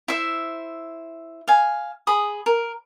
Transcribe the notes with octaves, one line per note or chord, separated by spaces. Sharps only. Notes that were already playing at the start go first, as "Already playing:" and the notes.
E4 C5 E5
F5 G#5
G#4 B5 D#6
A#4